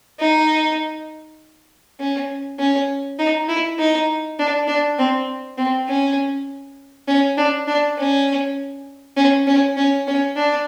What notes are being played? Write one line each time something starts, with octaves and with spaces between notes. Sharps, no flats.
D#4
C#4
C#4
D#4
E4
D#4
D4
D4
C4
C4
C#4
C#4
D4
D4
C#4
C#4
C#4
C#4
C#4
D4